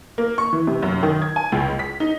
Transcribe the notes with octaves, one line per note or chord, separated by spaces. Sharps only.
A#3
C#6
E3
C3
F#2
D#3
G#6
G#5
C#2
B6
D#4